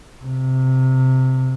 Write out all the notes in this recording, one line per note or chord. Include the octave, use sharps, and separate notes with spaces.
C3